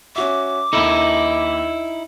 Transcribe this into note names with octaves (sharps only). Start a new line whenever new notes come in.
C#4 F#4 E5 D6
D#2 D#4 E4 A4